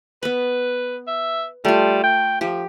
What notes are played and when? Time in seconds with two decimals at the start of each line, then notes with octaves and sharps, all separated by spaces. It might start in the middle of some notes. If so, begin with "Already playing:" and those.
0.23 B3 B4 B5
1.07 E5
1.65 G3 A3 F4
2.03 G5
2.41 F3 G4